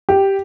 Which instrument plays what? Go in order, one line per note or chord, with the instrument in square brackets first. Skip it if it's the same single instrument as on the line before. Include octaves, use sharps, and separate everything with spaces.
[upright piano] G4